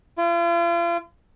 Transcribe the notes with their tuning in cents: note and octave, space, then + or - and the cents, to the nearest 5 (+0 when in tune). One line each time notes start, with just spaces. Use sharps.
F4 -40